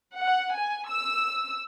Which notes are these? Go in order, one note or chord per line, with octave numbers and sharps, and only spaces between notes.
F#5
G#5
E6